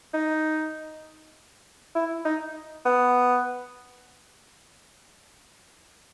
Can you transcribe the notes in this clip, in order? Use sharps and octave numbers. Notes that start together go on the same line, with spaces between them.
D#4
E4
D#4
B3